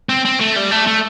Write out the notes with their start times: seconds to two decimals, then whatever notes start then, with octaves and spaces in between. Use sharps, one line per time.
0.09 C4
0.25 C4
0.40 A3
0.56 G3
0.71 A3
0.86 A3